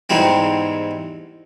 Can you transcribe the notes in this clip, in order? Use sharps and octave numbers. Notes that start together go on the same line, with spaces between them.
E2 G#2 G3 C4